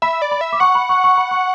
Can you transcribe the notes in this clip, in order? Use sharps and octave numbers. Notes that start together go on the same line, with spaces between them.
E5 B5
D5
B5
E5
D6
F#5 C#6
B5
C#6
C#6
B5
C#6